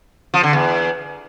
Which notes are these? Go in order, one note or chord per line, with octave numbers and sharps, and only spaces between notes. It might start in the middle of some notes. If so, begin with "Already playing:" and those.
F3
D3
E2